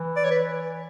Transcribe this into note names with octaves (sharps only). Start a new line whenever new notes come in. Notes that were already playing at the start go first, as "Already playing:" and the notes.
Already playing: E3
D5
C#5
B4